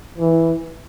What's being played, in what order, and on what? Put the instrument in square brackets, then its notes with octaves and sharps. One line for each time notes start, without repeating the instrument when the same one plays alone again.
[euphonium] E3